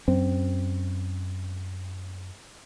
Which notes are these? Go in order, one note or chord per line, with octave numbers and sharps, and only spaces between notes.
F#2 C4